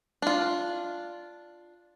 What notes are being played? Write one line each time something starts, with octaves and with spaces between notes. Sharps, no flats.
D4 F4